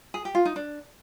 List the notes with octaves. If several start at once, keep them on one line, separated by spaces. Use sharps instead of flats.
G#4
G4
F4
D#4
D4